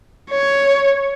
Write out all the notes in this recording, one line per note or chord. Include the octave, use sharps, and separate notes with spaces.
C#5